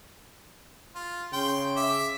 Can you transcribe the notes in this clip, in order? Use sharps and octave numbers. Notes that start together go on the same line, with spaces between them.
F4
C#3 G5 C6
E5 D6